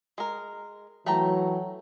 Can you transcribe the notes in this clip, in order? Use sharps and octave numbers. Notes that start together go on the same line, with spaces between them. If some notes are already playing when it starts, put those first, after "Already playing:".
G#3 A#4
E3 F#3 A3 G5 A#5